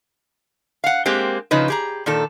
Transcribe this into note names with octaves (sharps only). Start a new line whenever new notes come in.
F5 F#5
G#3 A#3 C4 G4
C#3 F3 D#4 B4
G4 G#4 A#5
A#2 D#3 A4